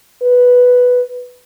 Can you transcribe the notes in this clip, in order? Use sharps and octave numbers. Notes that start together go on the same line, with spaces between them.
B4